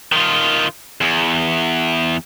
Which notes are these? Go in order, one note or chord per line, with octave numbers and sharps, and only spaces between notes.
D#3 F4
E2